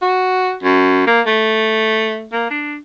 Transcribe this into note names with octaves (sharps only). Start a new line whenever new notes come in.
F#4
F#2
A#3
A3
A#3
D4